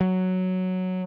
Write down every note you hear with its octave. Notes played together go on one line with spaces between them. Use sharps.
F#3